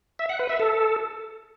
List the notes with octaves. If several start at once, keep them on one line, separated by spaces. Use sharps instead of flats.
E5
F#5
B4
E5
A4